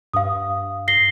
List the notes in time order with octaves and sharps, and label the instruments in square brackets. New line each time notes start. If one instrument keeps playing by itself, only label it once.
[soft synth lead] G2 [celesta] F5 D#6
[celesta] A#6 C7 G7